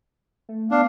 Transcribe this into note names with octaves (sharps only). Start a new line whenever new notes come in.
A3
B3 D4 F5